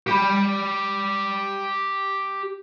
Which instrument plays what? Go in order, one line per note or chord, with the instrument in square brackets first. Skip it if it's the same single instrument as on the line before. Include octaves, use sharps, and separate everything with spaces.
[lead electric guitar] G4 B5